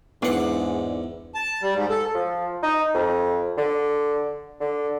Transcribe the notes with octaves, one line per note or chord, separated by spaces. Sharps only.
E2 G#2 D4 F#5
A5
G3
G#2
A4
F3
D#4
F2
D3
D3